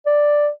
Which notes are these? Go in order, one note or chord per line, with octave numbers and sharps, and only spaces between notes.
D5